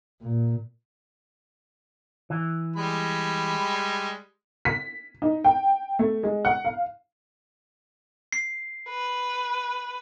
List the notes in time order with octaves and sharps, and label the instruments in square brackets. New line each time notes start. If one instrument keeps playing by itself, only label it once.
[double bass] A#2
[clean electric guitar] E3
[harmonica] G3 G#3 B5
[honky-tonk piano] B6
D#4
G5
A3
G#3
F#5
F5
[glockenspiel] C7
[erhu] B4